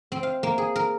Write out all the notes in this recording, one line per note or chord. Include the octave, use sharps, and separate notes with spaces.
C4
F5
A#3
G#4
A#4